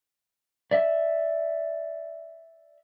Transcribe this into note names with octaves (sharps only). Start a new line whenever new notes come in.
D5 E5